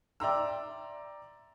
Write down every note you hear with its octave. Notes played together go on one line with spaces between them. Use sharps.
D5 E5 G5 A#5 C6 E6